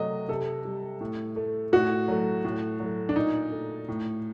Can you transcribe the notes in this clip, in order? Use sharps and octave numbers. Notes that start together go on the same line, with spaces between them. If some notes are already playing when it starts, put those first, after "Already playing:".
Already playing: C3 F#3 A3 D#5
C3 A4
G3
A2
A3
A2 F#4
F#3 A3
A2
F#3
A3
D4
A#2 D#4
A3
A2